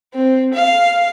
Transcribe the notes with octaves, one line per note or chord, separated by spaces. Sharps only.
C4
F5